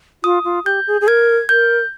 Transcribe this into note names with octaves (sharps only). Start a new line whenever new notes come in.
F4 D#6
F4
G4 G6
G#4
G#4
A#4 G#6
A#4 G6